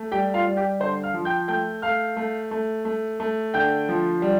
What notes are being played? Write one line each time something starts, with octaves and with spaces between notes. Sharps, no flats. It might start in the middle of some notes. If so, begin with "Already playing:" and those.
Already playing: A3
G3 G4 G5
F4 F5
G3
G4 G5
D3 C5 C6
F5 F6
F3
G5 G6
A3 G5 G6
A3 F5 F6
A3
A3
A3
A3
D3 G5 G6
F3
G3